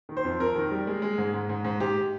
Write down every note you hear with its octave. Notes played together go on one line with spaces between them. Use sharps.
D#3
C5
F2
F2 A#4
D#3
G3
G#3
G#3
G#2
G#2
G#2
G#2
G#2 G4